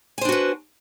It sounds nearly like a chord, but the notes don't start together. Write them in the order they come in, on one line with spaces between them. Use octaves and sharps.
G#5 C5 D4 F#4 B4